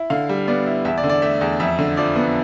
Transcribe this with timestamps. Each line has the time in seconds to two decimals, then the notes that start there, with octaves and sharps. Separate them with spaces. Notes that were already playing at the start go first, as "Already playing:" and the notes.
Already playing: E4
0.10 D3 F5
0.29 G3
0.48 B3 D5
0.66 E4
0.85 E2 E5
0.98 D5
1.04 D3
1.10 D5
1.22 A3 E5
1.41 E2
1.60 F2 E5
1.79 D3
1.97 F3 D5
2.16 B3